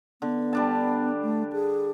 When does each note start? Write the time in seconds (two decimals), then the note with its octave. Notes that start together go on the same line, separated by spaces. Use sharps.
0.22 D3 B3
0.53 G3 D4 A5
1.23 A3
1.53 G#4